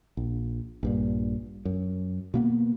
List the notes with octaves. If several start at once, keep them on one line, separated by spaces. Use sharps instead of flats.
A#1
A#1 G2 A#2
F#2
B2 A#3 B3